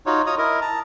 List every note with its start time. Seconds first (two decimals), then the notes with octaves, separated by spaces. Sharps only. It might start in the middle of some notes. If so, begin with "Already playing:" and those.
0.06 D#4 F4 F#4 C#5
0.26 F4 C#5 D#5 A#5 D#6
0.38 E4 A#4 D#5
0.62 A5 A#5